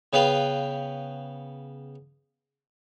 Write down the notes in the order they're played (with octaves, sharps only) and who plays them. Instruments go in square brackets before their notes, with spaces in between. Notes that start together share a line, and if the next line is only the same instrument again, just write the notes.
[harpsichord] C#3 B3 B4 F5 G5